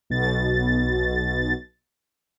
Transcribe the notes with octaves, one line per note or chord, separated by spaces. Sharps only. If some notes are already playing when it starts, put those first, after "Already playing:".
B1 B2 A6